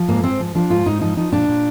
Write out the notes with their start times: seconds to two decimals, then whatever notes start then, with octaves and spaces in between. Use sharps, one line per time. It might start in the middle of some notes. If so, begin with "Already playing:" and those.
Already playing: F3
0.08 G#2 A#3
0.23 G#2 C4
0.39 F3
0.55 F3 D4
0.70 G#2 F4
0.86 G#2 D#4
1.01 F3 D#4
1.17 F3 D#4
1.32 A#2 D4
1.48 A#2